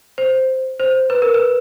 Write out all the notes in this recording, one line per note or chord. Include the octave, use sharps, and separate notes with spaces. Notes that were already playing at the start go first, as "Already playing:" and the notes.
C5
C5
B4
A#4
B4